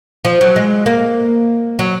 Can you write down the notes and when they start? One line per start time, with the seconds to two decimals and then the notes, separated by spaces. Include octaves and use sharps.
0.25 F3
0.41 F#3
0.56 G#3
0.86 A#3
1.79 F#3